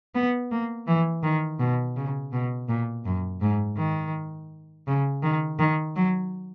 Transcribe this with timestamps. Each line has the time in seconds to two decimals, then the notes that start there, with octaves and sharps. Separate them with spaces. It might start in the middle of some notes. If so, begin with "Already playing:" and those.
0.15 B3
0.51 A#3
0.87 E3
1.23 D#3
1.59 B2
1.96 C#3
2.33 B2
2.69 A#2
3.05 F#2
3.41 G#2
3.77 D#3
4.87 C#3
5.23 D#3
5.59 D#3
5.96 F#3